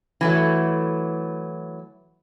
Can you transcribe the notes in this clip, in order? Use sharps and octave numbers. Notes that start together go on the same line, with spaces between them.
E3 F#3 A3